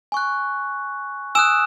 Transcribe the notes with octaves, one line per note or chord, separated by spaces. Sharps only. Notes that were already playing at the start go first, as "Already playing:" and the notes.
G#5 C#6 F#6
G#5 D#6 E6 F#6 E7